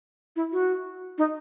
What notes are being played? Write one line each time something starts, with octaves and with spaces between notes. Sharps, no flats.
E4
F#4
D#4